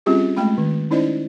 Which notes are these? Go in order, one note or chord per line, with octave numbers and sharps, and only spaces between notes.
G3 C4 C#4 F4 G4 G#4
G#3 A3 G5 B5
D#3
C#4 D#4 E4 C5 D5 D#5